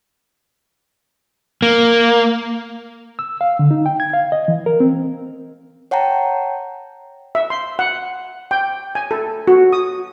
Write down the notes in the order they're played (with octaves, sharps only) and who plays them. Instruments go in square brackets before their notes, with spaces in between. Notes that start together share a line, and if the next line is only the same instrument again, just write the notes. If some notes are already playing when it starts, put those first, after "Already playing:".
[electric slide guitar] A#3
[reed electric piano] E6
F5
D3
D#4
G5
G#6
F5
D#5
E3
A#4
C4
[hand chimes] C#5 F#5 G5 A5 A#5
[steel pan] E5
C6
F#5
G5
G#5
A4
F#4
D#6